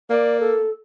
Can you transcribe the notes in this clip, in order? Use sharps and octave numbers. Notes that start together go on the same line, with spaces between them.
A#3 D5
A4